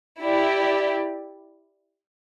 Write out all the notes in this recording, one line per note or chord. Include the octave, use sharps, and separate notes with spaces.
E4 G4 D5